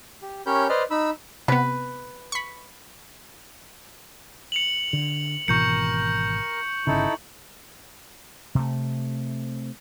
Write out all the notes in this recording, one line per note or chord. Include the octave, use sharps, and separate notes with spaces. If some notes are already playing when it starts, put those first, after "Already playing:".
G4
C#4 G4 A#4 C#5 B5 G6
B4 C5 D5 D#5 F6
D#4 B5 E6
C3 B3 B4
B5 C#6
C#7 F7 F#7
D3
G#1 B2 E3 A#4 C#6 G6 C#7
G1 C#3 D#4 E4 A4
C3 A3